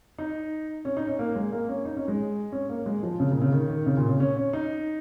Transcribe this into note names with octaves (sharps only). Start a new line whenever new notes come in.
D#4
C#4
D#4
C#4
A#3
G#3
A#3
C#4
D#4
C#4
G#3
C#4
A#3
G#3
F3
C#3
A#2
C#3
D#3
D#3
C#3
A#2
C#3
C#4
C#4
D#4